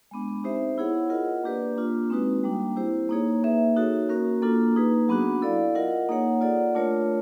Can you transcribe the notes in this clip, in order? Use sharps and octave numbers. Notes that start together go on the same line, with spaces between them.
G#3 B3 D4
C4 D#4 G4 C5 E5
B3 E4 G#4 C#5 F#5
F4 A#4 D#5 F#5
A#3 D4 G4 B4 D5
A#3 D4 F4
G#3 C4 D#4 F#4 B4
G3 A#3 D4
C4 E4 G4 C5
A#3 D#4 G#4 C#5
A#3 D#4 G#4 B4 E5
D#4 F#4 A4 C#5
A#3 C#4 F#4 A#4
A#3 D4 F4 A4
A#3 D#4 G#4 B4
F#3 B3 D4 F#4
E4 A4 D5 F5
F4 A#4 D#5 F#5
A#3 D#4 G#4 C#5 F#5
F4 A4 D5 F#5
A3 D4 F4 A#4 C#5